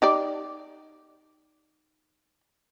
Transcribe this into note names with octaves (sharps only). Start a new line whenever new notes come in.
D#4 G4 D5